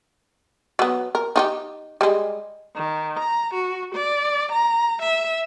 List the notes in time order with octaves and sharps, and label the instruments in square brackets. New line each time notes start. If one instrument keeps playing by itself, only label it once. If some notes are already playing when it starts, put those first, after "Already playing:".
[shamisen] F#3 B3
A#4
D#4 F4 G4
G3 G#3
[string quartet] D#3
A#5
F#4
D5
A#5
E5